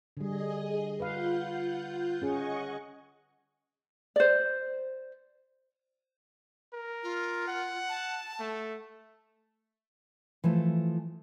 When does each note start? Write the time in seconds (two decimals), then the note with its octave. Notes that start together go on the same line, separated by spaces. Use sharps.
0.17 D3 G3 G#4 D#5
1.00 F4 B4 F5 F#5 G6
2.22 C#4 G#4 D#5 F#5 C#6
4.16 C5 D5
6.73 A#4
7.03 F4
7.48 F#5
7.89 A5
8.40 A3
10.44 E3 F3 A3